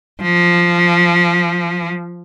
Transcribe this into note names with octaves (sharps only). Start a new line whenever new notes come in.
F3